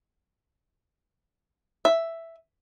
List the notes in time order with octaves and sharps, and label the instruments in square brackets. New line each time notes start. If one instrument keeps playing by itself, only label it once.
[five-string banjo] E5